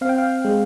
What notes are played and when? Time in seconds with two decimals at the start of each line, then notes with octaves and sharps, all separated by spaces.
0.01 C4 F5
0.09 G5
0.18 F5
0.45 G#3